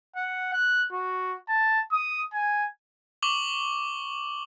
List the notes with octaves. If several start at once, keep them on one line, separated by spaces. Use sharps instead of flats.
F#5
F#6
F#4
A5
D#6
G#5
C#6 D6 F#7 G7